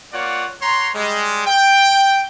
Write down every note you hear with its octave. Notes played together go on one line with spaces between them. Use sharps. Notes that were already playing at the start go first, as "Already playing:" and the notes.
A#3 F4 C#5 D5 F#5
C#5 F#5 A#5 C6
G3 G#3
G5